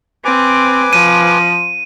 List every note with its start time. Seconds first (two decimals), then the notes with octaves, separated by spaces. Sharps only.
0.25 C4 B4 G#5 D6
0.93 F3 D#7